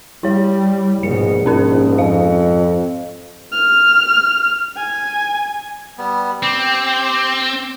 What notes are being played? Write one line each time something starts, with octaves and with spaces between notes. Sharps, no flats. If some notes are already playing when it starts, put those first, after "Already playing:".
G3 E4 C#5
A#1 G#2 B2 C#7
G#2 C#4 D#4 A#4
F2 F5
F6
G#5
G3 B3
C4 G4